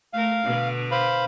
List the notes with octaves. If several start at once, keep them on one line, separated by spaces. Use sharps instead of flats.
A3 A#4 F5
B2 D3 B3
C5 F5 B5